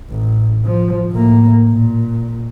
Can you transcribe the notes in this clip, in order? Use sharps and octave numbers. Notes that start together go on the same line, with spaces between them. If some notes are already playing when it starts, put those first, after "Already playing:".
A1
F3
A2 A#3
A#2